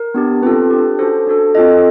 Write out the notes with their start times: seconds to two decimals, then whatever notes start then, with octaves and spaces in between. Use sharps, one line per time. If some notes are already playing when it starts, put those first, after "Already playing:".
Already playing: A#4
0.14 B3 D4 G4
0.43 C4 F4 A4 B4
0.70 D4 G4
0.99 C#4 F#4 A4 C5
1.27 D4 F#4 A4
1.55 C4 F4 A4 D#5